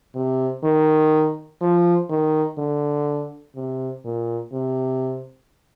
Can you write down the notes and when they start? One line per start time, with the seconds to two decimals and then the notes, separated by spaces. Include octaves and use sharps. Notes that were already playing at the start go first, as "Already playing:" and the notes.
0.15 C3
0.64 D#3
1.61 F3
2.09 D#3
2.58 D3
3.56 C3
4.04 A#2
4.53 C3